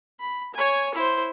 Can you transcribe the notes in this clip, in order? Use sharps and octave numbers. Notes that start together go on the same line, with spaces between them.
B5
C#5 G#5
E4 C5